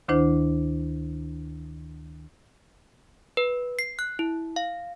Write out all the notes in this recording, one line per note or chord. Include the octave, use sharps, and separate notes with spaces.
D2 D#3 D4 E4 C5
B4
C7
F#6
E4
F5